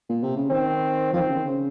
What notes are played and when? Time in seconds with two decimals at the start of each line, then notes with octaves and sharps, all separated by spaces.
0.09 A#2
0.23 C3
0.36 C#3
0.50 D#3 C4
1.13 F3 C4
1.21 D#3
1.29 C#3
1.37 D#3
1.45 C#3